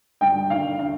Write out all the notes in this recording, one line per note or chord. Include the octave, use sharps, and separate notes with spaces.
G2 D3 G5
D#2 D3 F5
D3 F5